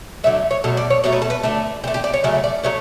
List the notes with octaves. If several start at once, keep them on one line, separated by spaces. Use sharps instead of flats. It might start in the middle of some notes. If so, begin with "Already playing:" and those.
D3 F#3 A3 E5
C#5
B2 F#3 A3 A4
D5
C#5
B2 F#3 A3 C#5
B4
A4
B4
D3 A3 A4
D3 A3 G4
G4
D5
C#5
C#3 F#3 A3 E5
D5
F#3 A3 C#5